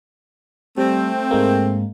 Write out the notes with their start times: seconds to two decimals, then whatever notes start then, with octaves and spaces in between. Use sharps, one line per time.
0.78 G3 A3 C4
1.31 G#2 G#3 A#3